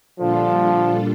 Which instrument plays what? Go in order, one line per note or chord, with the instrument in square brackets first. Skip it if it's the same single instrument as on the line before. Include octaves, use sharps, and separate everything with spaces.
[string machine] A#2 G3 D4 F4 A4 [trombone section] D3 F3